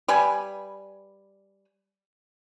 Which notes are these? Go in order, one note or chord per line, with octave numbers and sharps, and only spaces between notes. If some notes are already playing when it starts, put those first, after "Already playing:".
G3 B4 G#5